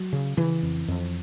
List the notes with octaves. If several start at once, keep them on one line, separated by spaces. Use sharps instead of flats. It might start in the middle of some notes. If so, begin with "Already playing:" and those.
Already playing: F#3
C#3
C#3 E3
F2
F2